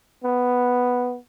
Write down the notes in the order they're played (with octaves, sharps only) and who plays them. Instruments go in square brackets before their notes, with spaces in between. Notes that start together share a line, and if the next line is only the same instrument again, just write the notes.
[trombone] B3